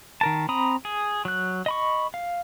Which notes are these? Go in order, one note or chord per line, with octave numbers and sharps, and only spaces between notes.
D#3 A#4 A5
C4 A#5 B5 D#6
G#4
F#3 F#6
D#5 B5 C#6
F5